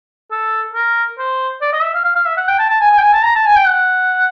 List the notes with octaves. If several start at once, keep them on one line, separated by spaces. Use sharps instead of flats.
A4
A#4
C5
D5
D#5
E5
F5
F5
F5
E5
F#5
G5
A5
A5
G#5
G#5
G5
G#5
A5
A#5
A5
G#5
G5
F#5